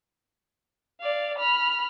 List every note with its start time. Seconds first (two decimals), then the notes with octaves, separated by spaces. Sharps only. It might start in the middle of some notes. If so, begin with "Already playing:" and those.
1.00 D5 F5
1.38 B5 F6